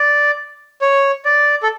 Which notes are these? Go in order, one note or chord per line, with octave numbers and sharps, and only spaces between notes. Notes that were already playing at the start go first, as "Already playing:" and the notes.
Already playing: D5
C#5
D5
A4